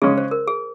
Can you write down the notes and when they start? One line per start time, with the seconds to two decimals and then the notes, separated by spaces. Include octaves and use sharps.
0.02 C#3 G#3 C#4 G#4
0.18 C5
0.31 A#4
0.47 G#4